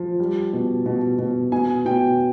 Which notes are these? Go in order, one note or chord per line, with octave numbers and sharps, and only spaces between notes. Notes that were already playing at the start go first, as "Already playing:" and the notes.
Already playing: F3
G3
B2
B2
B2
B2 G#5
B2 G5